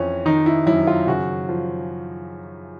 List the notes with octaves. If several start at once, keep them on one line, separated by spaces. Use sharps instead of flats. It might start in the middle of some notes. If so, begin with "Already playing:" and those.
Already playing: F2 E3 C#4
D#3 D#4
E4
F#2 E4
F4
C#3 F#4
F3